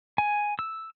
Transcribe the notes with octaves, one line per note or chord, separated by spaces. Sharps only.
G#5
E6